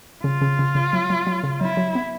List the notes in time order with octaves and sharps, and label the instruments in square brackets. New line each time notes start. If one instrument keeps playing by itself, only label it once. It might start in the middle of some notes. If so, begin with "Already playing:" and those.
[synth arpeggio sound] C#3 [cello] F4
[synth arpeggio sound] C#3
C#3
C#3
F#3
F#3
F#3
C#3
[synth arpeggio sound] F#3 [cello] E4
[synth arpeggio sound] F#3
B3